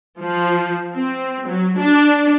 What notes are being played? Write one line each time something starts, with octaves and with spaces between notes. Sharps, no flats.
F3
C4
F#3
D4